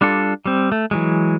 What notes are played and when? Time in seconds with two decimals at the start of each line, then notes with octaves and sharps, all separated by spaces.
0.01 G3 D4 F4 A4
0.46 G3 C4
0.72 A3
0.91 E3 F#3 G#3